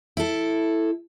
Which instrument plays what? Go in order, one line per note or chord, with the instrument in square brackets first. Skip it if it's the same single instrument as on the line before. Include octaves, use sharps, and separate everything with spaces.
[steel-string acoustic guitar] E4 A4